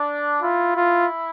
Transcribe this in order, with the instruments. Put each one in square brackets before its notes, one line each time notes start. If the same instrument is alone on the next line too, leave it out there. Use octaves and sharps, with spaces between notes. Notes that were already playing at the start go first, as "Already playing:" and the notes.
Already playing: [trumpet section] D4
[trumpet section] E4 [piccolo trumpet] F4
[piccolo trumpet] F4